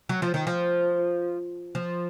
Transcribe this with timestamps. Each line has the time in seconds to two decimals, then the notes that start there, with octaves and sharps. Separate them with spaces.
0.09 F#3
0.22 F3
0.34 D#3
0.47 F3
1.75 F3